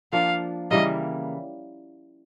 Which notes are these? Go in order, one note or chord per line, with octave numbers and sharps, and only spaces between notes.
F3 A#3 D4 F5
C#3 E3 G3 A#3 D#5